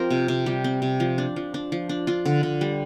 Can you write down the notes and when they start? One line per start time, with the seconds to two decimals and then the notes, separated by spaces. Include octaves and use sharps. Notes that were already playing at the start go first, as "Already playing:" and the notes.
Already playing: F3 C4 F4 G4 A#4 C5
0.10 C3
0.28 C3
0.46 G3 G4
0.64 C4
0.82 C3
1.00 F3
1.18 D4
1.36 F3
1.54 D4
1.72 F3
1.89 D4
2.07 D4 F4
2.25 D3
2.43 D3
2.61 G3